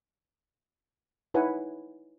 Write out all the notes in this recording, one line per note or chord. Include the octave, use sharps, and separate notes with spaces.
D#4 E4 B4 C#5 F#5 G#5